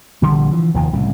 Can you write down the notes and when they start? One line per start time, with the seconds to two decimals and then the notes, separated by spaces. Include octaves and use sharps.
0.22 A#1 D3 F3 G3
0.51 E3 F3
0.74 F1 D#2 D#3 F3
0.93 C2 A2 C#3